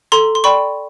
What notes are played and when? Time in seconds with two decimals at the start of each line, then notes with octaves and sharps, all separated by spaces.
0.12 A4 A#5 C6
0.35 C6
0.44 D5 G5 B5 C#6